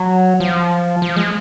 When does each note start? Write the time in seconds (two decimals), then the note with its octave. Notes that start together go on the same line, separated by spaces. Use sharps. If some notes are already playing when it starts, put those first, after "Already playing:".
Already playing: F#3
0.40 F3
1.02 F3
1.16 G#3